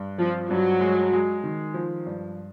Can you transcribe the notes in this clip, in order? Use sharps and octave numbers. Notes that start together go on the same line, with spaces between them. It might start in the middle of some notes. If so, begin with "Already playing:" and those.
Already playing: G2
F3 C4
G2 F#3
G#3
G#3
D#3
F3
G2